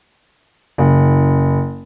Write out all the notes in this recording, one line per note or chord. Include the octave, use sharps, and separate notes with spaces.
F#1